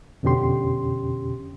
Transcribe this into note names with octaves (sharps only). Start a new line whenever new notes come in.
F2 B2 D3 C#4 G4 C6